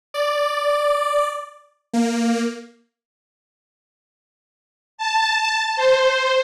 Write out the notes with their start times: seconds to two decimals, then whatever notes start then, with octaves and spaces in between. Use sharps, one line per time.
0.14 D5
1.93 A#3
4.98 A5
5.76 C5